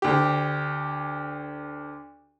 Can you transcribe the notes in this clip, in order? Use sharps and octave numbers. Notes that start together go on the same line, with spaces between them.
D2 G4